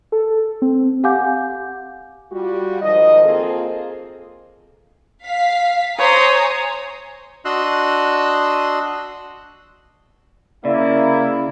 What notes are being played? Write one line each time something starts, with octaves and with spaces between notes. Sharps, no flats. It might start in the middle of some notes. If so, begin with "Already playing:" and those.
A4
C4
G4 F5 F#5 G#5 D6 G6
G3 F4 F#4
G#2 D#3 F3 D#5
A#3 C4 F4 G#4 A4
F5 B6
C5 C#5 G#5 A#5 D#6
D4 F#4 D#5 C6 E6 F#6
C#3 A#3 E4 D5